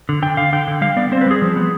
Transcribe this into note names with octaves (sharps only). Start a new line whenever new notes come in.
D3
D3 G5
D3 F5
D3 G5
D3
G3 F5
B3 D5
C4 C5
B4
G3 G#4
F3
B3